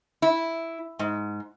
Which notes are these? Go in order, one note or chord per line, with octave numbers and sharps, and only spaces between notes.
E4
G#2